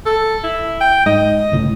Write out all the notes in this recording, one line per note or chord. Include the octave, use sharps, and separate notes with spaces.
A4
E4
G5
G#2 D#5
G1 C#2 A2